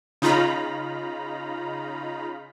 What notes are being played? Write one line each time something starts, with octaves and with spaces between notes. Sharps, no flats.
C#3 D#4 F4 A#5 B5